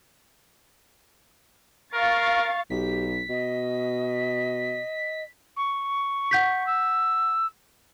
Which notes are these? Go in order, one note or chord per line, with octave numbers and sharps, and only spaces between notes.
A#4 F5 C#6 A6
B1 G4 B6
B2 D#5
C#6
F#5 G6 B6
E6